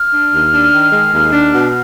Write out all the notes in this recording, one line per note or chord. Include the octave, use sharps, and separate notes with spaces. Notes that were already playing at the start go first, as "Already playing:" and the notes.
Already playing: F6
D4
D#2
D4
D#3
G#3
D#2
D4
B2